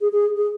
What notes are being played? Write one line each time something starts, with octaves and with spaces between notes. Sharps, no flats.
G#4
G#4
G#4